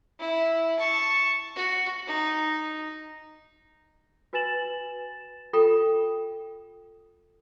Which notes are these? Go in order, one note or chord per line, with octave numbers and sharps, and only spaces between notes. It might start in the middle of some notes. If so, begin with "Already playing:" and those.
E4
A5 C#6
F#4
D#4
F#4 B4 G#5 A6 E7 F#7
F4 A4 G5 B5